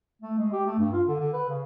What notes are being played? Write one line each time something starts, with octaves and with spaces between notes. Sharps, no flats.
A3
G#3
G4
A3
G2
F4
D3
D3
B4
C#3